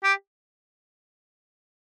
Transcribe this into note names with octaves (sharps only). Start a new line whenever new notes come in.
G4